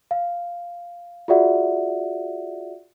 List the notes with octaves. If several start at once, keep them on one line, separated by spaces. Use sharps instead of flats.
F5
F4 F#4 G#4 D5 E5 F#5